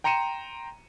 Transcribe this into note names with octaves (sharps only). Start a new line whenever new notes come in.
G5 A#5 C6 C#7 D#7 E7